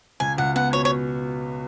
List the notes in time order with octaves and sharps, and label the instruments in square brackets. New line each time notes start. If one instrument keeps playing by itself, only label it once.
[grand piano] C#2 [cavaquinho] G#5
[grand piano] C#2 [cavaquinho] F#5
[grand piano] B3 [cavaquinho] F#5
[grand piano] B2 [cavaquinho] C#5
[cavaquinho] C#5